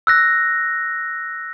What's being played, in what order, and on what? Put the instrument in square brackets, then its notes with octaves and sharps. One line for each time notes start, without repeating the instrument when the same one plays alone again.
[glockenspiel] E6 F#6 A#6